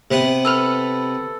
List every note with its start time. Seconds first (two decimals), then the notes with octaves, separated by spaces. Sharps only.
0.11 C3 B3 F#5
0.45 A4 B4 F6